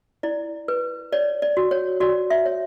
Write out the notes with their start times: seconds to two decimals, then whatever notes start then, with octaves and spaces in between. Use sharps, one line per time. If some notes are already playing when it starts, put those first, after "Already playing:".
0.23 E4 D5
0.68 B4
1.13 C#5 D5
1.42 D5
1.57 F#4
1.71 C#5
2.00 F#4 D5
2.30 E5
2.46 C#5